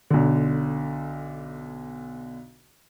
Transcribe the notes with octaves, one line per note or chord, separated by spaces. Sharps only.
B1 D3